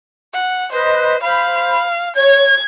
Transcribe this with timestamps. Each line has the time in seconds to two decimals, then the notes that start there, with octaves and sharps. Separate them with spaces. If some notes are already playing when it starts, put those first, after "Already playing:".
0.33 F#5
0.72 B4 C5 D#5
1.23 C5 F5 B5
2.15 C#5 G#6